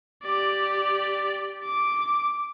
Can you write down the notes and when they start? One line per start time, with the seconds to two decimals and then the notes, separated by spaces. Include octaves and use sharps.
0.23 G4 D5
1.64 D6